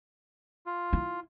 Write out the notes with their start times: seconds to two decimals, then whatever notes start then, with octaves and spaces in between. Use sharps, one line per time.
0.66 F4
0.93 E4